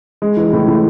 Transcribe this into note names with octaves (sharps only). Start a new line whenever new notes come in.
G#3
E3
A2
A2